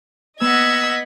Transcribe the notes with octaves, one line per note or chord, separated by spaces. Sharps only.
B3 D#5 F#5 E6 G#6 B6